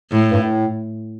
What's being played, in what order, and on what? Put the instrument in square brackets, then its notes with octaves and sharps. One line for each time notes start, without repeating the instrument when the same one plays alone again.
[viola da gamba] A2
[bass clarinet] G2
A2